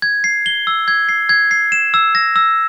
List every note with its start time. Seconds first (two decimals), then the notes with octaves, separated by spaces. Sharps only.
0.02 G#6
0.24 C7
0.46 G7
0.67 E6
0.88 G#6
1.09 C7
1.29 G#6
1.51 C7
1.72 E7
1.94 E6
2.15 A#6
2.36 E6